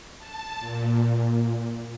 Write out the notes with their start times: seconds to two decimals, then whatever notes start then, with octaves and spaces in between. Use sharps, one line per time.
0.18 A5
0.59 A#2